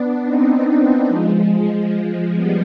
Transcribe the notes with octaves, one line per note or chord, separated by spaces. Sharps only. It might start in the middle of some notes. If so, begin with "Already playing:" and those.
Already playing: B3 D4
C4 D#4
B3 D4
F3 G#3
F3 G#3
G3 B3